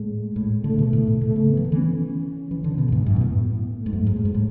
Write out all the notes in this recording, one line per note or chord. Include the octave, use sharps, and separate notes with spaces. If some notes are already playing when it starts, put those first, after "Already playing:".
Already playing: A2 G#3
A2
D3 A3
B2
A2
B2
B2 A3
C#3
B3
E3
D3
E3
C#4
E3
D3
B2
F#2
G#2 B3
F#2
B2
A2
B3
A3
G#2
F#2
G#2 G#3
A2
G#2
A2